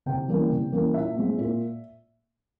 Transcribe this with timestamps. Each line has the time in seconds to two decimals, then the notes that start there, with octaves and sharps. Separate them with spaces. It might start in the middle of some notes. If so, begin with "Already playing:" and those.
0.06 C3 G5
0.28 E3 G3 A#3 C#4
0.50 C3
0.72 E3 G3 A#3 C#4
0.94 A#2 E5
1.16 G#3 C4
1.38 A#2